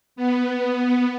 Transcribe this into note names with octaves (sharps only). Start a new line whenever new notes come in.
B3